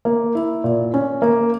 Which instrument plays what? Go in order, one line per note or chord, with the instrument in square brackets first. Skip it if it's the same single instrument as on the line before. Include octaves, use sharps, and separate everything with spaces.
[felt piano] A#3
E4
A#2
C#4
A#3